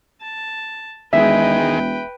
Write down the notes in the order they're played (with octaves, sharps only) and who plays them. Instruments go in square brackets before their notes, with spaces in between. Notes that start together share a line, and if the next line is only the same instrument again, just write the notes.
[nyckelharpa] A5
[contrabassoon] E1 [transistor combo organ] D#3 G#3 [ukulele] G#4 E5 [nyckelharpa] B4 G5